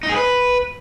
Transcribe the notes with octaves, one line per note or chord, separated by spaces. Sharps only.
D#4
G#4
B4